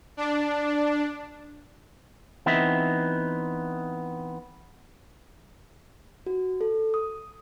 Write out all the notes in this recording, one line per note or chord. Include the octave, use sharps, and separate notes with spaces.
D4
E3 B3 C4 D#4 E5
F#4
A4
D#6